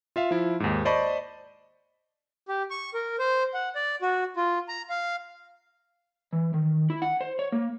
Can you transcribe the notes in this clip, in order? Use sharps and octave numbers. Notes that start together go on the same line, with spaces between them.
F4 E5 F5
F3 E4
D#2 G#2
C5 D5 D#5 A5 B5 C#6
G4
C#6
A#4
C5
F#5
D5
F#4
F4
A#5
F5
E3
D#3
E4
F#5
C5
C#5
A#3